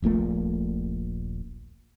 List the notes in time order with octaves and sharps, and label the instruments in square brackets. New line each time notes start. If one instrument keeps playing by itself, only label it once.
[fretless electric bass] D#1 A#1 A#2 A3